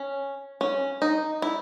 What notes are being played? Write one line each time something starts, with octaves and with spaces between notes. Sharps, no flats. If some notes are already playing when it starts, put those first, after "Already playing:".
Already playing: C#4
C#4
D#4
E4